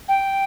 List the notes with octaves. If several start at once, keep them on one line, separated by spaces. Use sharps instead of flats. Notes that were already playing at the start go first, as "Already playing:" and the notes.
G5